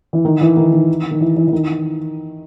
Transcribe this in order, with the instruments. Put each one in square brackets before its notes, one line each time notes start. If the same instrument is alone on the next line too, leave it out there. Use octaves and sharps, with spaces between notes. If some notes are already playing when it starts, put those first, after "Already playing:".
[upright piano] E3
D#3
E3
D#3
D#3
D#3
E3
E3
E3
D#3